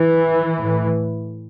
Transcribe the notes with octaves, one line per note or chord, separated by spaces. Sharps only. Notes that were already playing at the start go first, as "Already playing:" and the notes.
Already playing: E3
A2